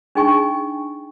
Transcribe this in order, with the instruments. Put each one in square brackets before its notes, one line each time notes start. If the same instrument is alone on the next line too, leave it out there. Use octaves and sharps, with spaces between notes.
[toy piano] D4 D#4 G#4 G5 G#5 C#6